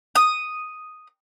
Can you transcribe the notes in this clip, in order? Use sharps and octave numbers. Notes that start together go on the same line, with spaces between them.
D#6